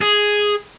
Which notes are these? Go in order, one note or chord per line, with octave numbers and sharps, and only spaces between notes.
G#4